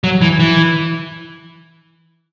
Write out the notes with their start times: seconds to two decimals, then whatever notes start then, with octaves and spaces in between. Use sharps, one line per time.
0.04 F#3
0.21 E3
0.39 E3